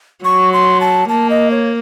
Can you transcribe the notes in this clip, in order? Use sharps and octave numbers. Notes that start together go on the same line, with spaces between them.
F#3 C#6
C6
A5
A#3 A5
D#5
C#5